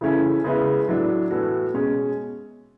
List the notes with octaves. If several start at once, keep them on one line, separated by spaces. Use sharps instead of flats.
C#3 E3 A3 C#4 E4
C#3 G#3 B3 E4
A2 F#3 A3 D4
A2 E3 B3 F#4 A4
B2 G#3 C#4 G#4